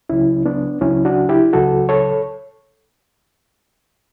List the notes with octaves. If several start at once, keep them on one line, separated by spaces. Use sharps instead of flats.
C#2 C#3 F#3 C#4 E4
B3 D4
C#2 C#3 F#3 C#4 E4
D4 F#4
E4 G4
C#2 C#3 F#3 F#4 A4
A4 C#5